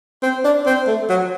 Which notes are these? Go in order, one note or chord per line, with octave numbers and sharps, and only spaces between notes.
C4
D4
C4
A3
F#3